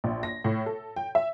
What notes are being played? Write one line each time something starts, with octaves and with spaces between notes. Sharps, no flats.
A#1
A#6
A2
A4
G5
E5